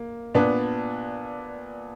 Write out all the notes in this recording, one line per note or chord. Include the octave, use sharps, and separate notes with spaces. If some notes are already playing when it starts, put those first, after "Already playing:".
Already playing: A#3
A#2 B3 D4